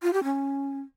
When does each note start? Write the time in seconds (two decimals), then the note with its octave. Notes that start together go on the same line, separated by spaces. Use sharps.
0.03 F4
0.13 G4
0.24 C#4